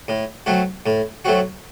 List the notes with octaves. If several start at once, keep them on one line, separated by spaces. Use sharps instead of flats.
A2
F#3 A3 C4 F#4
A2
F#3 A3 C4 F#4